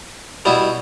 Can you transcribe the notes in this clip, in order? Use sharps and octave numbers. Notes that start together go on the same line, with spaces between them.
B2 G3 B3 E4